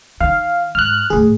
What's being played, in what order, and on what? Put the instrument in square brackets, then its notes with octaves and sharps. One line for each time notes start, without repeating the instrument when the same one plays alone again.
[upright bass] D#3 [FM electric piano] F5
[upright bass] G#2 [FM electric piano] F6 F#6
[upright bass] D#2 A2 [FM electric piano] G#4